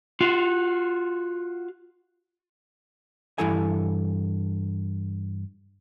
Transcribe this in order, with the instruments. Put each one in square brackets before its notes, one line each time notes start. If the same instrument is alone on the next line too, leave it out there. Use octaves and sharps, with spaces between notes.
[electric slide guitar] F4 F#4
[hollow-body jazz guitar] G2 E3 E4 A4 G#5